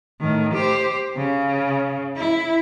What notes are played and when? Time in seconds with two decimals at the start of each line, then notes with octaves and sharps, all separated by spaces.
0.20 A2 D#3
0.54 G4 C5
1.17 C#3
2.16 E4